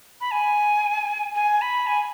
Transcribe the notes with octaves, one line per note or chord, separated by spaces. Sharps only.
B5
G#5
G#5
B5
G#5